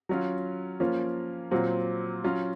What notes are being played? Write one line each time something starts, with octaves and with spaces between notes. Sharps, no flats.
F#3 C#4 F4
F3 A#3 C#4 F4
A#2 F#3 C4
F#3 C#4 F4